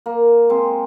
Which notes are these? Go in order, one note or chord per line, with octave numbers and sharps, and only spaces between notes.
A#3
G#3 C4